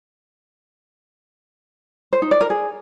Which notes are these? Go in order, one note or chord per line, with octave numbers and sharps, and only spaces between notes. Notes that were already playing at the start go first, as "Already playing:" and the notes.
C5
D#4
D5
A#4
G#4